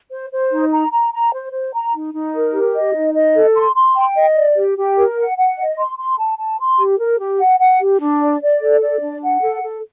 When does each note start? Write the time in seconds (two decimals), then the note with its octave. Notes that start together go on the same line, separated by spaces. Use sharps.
0.11 C5
0.31 C5
0.51 D#4
0.71 A#5
0.91 A#5
1.12 A#5
1.32 C5
1.52 C5
1.73 A#5
1.93 D#4
2.14 D#4
2.34 A#4
2.53 G4
2.74 D#5
2.94 D#4
3.14 D#5
3.35 A4
3.55 C6
3.75 C6
3.95 G5
4.15 D#5
4.36 D5
4.56 G4
4.77 G4
4.96 A#4
5.17 F#5
5.38 F#5
5.58 D#5
5.77 C6
5.98 C6
6.18 A5
6.38 A5
6.59 C6
6.79 G4
6.99 A#4
7.20 G4
7.39 F#5
7.60 F#5
7.80 G4
8.00 D4
8.21 D5
8.42 D5
8.61 A4
8.82 D5
9.02 D4
9.22 F#5
9.43 A4
9.62 A4